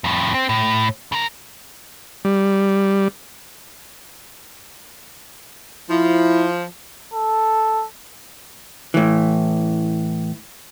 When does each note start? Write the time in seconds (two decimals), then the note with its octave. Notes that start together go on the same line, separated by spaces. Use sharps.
0.04 F2 A2
0.34 C4
0.49 A2
1.12 C#3 A#4
2.25 G3
5.90 F3 E4
7.14 A4
8.94 A2 E3